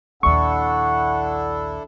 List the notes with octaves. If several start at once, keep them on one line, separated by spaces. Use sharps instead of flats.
A#1 D#2 D4 E4 A4 F#5 C#6